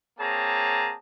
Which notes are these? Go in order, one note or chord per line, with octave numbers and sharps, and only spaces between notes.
A#3 C4 G#4 C#5 A5 A#5